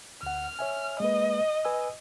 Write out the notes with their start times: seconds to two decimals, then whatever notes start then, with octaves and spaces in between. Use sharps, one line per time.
0.23 D2 F#5 F6
0.59 C#5 E5 G#5
1.00 G#3 A#3 B4 D#5
1.65 B4 G#5 E6